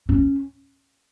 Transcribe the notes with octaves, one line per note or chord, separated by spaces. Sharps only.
C#4